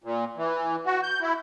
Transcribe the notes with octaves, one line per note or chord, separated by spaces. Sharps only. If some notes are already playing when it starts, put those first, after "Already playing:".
A#2
E3
F#4
G6
E4